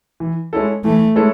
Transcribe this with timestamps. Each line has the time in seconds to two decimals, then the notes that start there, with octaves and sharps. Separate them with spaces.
0.20 E3
0.53 G#3 C#4 E4 A4
0.84 E3 A3
1.16 G#3 C#4 E4 A4